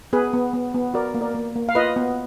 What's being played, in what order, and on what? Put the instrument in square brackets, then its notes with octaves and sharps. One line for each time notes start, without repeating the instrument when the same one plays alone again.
[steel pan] B3 G#4 B4
B3
B3
B3
F#4 A#4 D5
A#3
A#4 D5
A#3
A#3
F5
F4 B4 D#5
B3